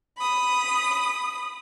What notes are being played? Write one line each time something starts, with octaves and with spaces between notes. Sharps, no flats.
B5 D#6